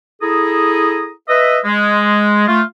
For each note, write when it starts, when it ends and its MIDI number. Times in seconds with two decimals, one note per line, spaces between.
0.22 1.11 64
0.22 1.11 68
0.22 1.11 69
0.22 1.11 82
0.22 1.11 87
1.29 1.59 71
1.29 1.59 75
1.29 1.59 76
1.65 2.46 56
2.48 2.62 57
2.48 2.62 65